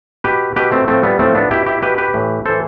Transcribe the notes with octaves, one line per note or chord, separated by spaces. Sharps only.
B2 G4 B4
B2 G4 B4
A3 C4
A2 F3 A3 C4
G3 B3
A2 F3 A3 C4
B3 D4
B2 E4 G4
E4 G4
B2 G4 B4
G4 B4
A2 E3
A2 E3 A4 C5